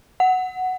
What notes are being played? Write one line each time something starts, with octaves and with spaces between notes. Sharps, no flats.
F#5